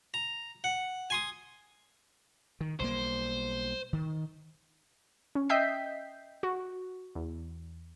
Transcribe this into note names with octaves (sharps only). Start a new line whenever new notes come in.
A#5
F#5
G#5 C6 D#6
D#3
B1 G3 A#3 C5
D#3
C#4
D#5 E5 G5 G6 B6 C7
F#4
E2